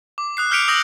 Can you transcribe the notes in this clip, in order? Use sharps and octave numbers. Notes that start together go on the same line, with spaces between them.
D6
D#6 F#6 C7
F6 G6 B6 C#7 D7 F7
D#6 E6 G6 A#6 F#7